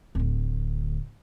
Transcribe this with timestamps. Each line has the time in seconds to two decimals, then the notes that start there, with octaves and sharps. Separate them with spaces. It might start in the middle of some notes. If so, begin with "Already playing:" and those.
0.15 D1 D2